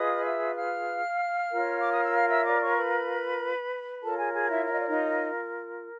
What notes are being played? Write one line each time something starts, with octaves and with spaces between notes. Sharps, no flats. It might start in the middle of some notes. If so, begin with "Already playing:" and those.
Already playing: F4 G#4 B4 D#5 D#6
F6
E5 E6
F5 F6
F4 A#4 C#5
D6
D#6
E6
F5 F6
E5 E6
D5 D6
C#5 C#6
C6
B4 B5
F4 A4 A#4 C#5 A5
G#4 G#5
G#4 G#5
E4 E5
E5
D#5
D5
D#4 D#5